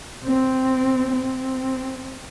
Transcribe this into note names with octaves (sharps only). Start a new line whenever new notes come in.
C4
C4